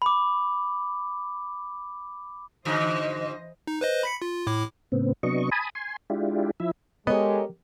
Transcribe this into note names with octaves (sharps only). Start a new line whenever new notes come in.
B5 D6
G#2 D3 E3 F#4 C5 D#5
D#4
B4 C5 D#5
B5 B6 C#7
F4
A2 E4 D6
A2 C#3 B3 C4
C3 F#3 B3 D4 D#5 C#6
G#5 A5 B5 D#6
G#5 C6
G#3 D4 E4 F4 G4
F3 E4 E5
G#3 B3 G4 A4 A#4 C#5 D#5